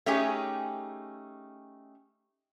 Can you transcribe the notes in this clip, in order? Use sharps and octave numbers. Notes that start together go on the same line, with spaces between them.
A3 C#4 D#4 G4 G#4